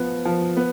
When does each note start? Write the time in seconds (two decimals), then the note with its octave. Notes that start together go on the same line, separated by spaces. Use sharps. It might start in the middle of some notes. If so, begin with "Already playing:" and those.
Already playing: F3 B3
0.25 F3
0.57 B3